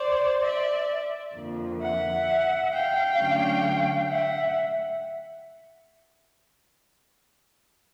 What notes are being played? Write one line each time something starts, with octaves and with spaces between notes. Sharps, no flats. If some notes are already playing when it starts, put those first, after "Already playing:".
Already playing: C5 D5
D5 E5
F2 D3 F3 A#3
E5 F#5
F5 G5
D3 F#3 A3 C#4
E5 F#5